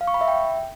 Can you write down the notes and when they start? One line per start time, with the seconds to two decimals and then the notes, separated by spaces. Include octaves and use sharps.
0.01 F5
0.08 C#6
0.14 B5
0.21 E5
0.28 G5